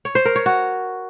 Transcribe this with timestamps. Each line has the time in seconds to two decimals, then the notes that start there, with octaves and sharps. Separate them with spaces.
0.05 C#5
0.15 C5
0.25 A#4
0.36 C#5
0.46 F#4